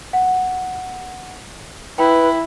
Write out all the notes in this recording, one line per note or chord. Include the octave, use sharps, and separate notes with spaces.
F#5
E4 B4 G5